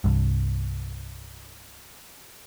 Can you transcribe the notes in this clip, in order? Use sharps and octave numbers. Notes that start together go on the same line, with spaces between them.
C2 G2